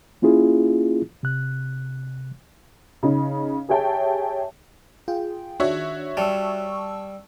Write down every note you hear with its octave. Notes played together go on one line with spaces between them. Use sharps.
A#3 C#4 E4 F4 G#4
C3 F#6
C#3 D#4
G4 G#4 C#5 E5 G5 A5
F4 G#4 G5
D#3 D4 F#4 C#5 E5
G3 A5 C#6 E6